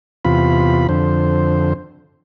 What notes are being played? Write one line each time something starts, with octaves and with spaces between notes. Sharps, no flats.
E2 C3 F4 B5
F2 D3 C5